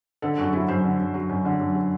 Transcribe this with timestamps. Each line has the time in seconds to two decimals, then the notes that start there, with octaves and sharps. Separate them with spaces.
0.22 D3 A4
0.37 F#2 F#4
0.53 F#3 E4
0.68 F#2 C5
0.84 D3
0.99 F#2
1.14 F#3
1.29 F#2
1.45 D3
1.60 F#2
1.75 F#3